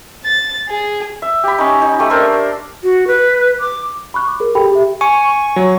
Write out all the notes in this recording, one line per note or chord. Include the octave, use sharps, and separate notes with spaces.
A6
G#4
E5
G4 B5
C#4 D#4
D#4
A3 G4
D4 A#4 C5 E5
F#4
B4
D6
B5 C#6 F#6
D6
G#4 A#4
G4 A4 G5 B5
G4 E5
G#5 C#6
F#3